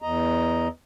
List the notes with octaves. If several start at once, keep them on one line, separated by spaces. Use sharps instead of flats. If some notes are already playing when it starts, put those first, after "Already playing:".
E2 D#5 A#5